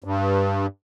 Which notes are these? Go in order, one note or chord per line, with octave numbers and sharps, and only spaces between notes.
G2